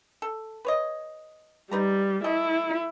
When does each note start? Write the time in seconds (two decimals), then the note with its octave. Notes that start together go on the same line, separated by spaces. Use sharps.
0.22 A4
0.65 B4 C#5 D#5
1.71 G3 D#4 B4 A#5
2.24 A3 E4 D#5